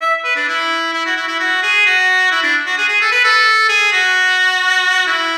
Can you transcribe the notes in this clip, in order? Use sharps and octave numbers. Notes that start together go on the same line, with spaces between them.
E5
B4
D4
E4
E4
F#4
E4
E4
F#4
G#4
F#4
E4
D4
F#4
G#4
G#4
A4
B4
A4
G#4
F#4
E4